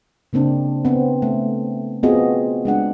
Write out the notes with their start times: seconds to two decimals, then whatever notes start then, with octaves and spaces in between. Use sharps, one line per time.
0.33 C#3 A#3 C4 D4
0.85 B3 C4
1.22 A3
2.03 B3 C4 F4 F#4 G#4 D#5
2.65 G#3 D4 F#5